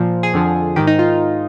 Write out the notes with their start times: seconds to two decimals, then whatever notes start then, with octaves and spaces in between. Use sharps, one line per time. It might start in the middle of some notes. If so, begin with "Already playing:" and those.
Already playing: A#2 F3
0.23 G#4
0.33 F2 D3 F3
0.76 G#2 D#3 G4
0.87 D#4
0.99 F4